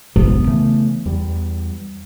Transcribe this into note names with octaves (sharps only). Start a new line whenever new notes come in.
B1 F2 G#2 B3
C#3 E3 A3
E2 G3